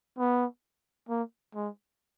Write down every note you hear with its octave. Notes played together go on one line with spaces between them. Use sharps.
B3
A#3
G#3